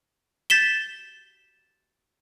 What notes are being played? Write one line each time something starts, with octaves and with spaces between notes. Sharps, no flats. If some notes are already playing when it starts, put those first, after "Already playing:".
G6 A6 B6 E7 G7